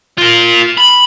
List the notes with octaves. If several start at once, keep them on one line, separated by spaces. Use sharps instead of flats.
F4 A#4
B5